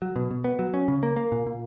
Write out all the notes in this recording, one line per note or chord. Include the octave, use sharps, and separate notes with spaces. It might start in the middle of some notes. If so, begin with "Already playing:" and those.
F#3
B2
B2
B3
F#3
C#4
C#3
A#3
A#3
A#2
A#2